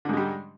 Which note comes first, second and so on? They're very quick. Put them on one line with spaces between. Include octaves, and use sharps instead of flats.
D3 G#2 G#3 G3